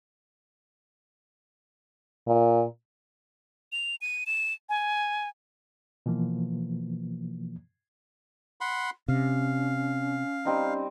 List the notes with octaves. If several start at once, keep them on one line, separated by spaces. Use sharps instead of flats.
A#2
F7
D#7
E7
G#5
B2 E3 F3 A#3
F#5 B5 C6
C3 C#4 F5
G3 C4 D#4